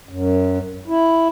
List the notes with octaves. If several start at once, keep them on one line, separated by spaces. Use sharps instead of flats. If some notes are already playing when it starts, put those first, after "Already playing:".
F#2
E4